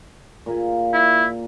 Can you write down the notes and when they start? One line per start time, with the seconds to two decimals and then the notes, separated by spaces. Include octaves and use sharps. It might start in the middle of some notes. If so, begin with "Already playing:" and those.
0.46 A#2 A#3 G#4
0.93 E4